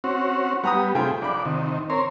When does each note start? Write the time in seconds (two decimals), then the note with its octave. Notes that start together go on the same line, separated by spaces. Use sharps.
0.04 C4 C#4 F#4
0.64 G3 B3 F#5 A#5 D#6
0.95 C3 A3 F4 G#4 G5
1.22 A#1 D5 B5
1.45 C3 D#3
1.90 C4 A#4 C#5 C6